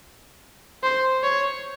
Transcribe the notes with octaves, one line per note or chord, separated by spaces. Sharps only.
C5
C#5